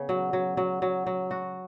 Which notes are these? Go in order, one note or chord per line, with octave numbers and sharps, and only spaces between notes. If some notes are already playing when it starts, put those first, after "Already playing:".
Already playing: C#3 B3
F#3
F#3
F#3
F#3
F#3
F#4